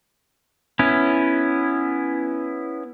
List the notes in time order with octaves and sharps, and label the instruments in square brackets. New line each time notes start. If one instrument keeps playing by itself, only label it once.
[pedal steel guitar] B3 C#4 E4